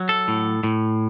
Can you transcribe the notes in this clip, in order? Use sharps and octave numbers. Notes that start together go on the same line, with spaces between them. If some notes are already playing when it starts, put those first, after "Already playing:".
Already playing: F#3
A4
A2
A2